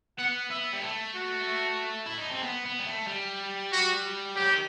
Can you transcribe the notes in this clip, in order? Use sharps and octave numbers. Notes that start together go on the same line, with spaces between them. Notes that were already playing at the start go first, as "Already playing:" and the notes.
B3 F#5
B3 E5
G3
A3
F#4
E4
D#4
C4
B3
B3
G3
A3
G3
F#4
F#3 G4
D#3